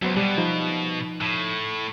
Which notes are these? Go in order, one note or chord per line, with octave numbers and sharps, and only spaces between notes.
C#2 F#3 B3 C5
B2 G3
F3 D#4
A2